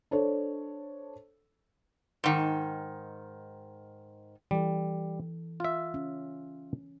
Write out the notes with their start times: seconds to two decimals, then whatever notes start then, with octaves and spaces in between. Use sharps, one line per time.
0.11 D4 A4 C5 C#5
2.24 G#2 D#3
4.51 E3 G3 A4
5.60 F4 E5
5.94 C#4